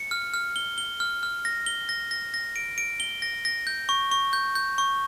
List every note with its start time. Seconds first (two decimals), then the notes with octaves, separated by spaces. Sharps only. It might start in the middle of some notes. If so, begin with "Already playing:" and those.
Already playing: C#7
0.11 F6
0.34 F6
0.56 G7
0.78 G7
1.00 F6
1.23 F6
1.45 A#6
1.66 G7
1.89 A#6
2.11 A#6
2.34 A#6
2.56 D7
2.78 D7
3.00 G7
3.22 A#6
3.45 A#6
3.67 G6
3.89 C#6
4.11 C#6
4.33 G6
4.55 G6
4.78 C#6